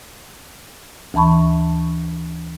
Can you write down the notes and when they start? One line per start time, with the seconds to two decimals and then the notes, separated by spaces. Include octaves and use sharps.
1.14 D2 E3 A5 B5 C#6